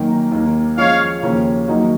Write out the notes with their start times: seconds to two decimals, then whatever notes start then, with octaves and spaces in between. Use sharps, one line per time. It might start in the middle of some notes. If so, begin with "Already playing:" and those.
Already playing: F#2 D#3 A#3
0.31 D#2 D#3 A#3
0.77 F3 G#3 C#4 C#5 F5
1.22 D#2 C#3 F3 A#3 C#4
1.68 F#2 D#3 A#3 D#4 F#4